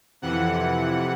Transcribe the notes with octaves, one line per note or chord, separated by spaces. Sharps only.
F2 C3 E3 F#5